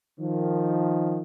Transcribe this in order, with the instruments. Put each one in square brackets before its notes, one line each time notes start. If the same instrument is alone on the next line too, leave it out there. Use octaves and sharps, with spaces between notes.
[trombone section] D#3 F3